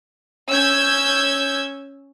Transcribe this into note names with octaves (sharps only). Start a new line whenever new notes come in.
C#4 E6 G6 G#6